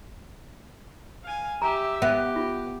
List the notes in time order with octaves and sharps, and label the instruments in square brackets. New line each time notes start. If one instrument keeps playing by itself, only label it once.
[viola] F5 G#5
[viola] G4 E5 [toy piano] A#5
[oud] B3 [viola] G4 [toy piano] E5
[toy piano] F4